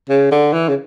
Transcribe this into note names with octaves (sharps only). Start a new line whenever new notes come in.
C#3
D3
E3
C#3